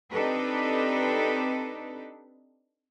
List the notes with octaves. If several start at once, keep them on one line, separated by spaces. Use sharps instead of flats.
C4 D4 D#4 G4 A4 B4